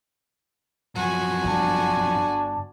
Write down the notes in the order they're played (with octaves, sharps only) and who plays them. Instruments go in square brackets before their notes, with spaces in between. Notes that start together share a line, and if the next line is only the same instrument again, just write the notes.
[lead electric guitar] F#2 F3 [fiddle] F#4 G#5
[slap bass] G1 [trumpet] D4